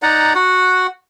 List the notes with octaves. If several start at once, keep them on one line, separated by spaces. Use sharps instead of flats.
D#4 D5 F#5 A#5
F#4 F#5